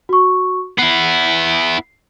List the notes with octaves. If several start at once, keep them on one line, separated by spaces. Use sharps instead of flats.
F#4 C#6
B3 E4 C7